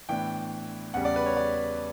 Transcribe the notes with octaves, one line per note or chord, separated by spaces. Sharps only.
A2 E3 B3 D4 G5
E2 C#3 G3 F#5
D5
B4
C#5
D5